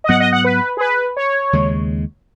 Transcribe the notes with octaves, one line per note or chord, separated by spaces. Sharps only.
D#5
G#2 F#3 B3 F#5
D#5
F#5
B4
G#4
B4
C#5
D#2 C#3 G#3